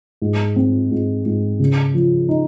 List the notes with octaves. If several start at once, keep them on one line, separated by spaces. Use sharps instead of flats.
G#2
C4
G#2
G#2
C#3
F3
D#4